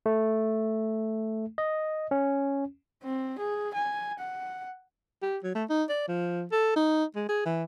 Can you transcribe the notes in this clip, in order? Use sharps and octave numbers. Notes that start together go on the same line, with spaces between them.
A3
D#5
C#4
C4
G#4
G#5
F#5
G4
F#3
A3
D#4
D5
F3
A4
D#4
G#3
G#4
E3